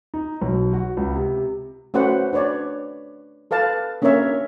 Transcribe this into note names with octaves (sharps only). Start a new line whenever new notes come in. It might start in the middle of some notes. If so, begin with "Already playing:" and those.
D#4
B1
F#4
C#2
C3
A3 C#4 F#4 B4 C5 F#5
D4 B4 C#5 D5
A4 B4 F5 A5
A#3 C#4 D4 A#4 C#5 E5